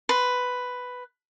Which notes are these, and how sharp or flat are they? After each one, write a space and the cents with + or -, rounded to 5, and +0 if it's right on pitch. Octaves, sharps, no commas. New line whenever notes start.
B4 +5 C6 +0